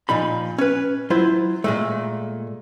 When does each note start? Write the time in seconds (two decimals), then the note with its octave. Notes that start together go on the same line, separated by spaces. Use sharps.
0.09 A#2 F3 D#4 B5
0.58 C#4 B4
1.10 F#3 E4 F4 C5
1.64 A#2 G#3 A3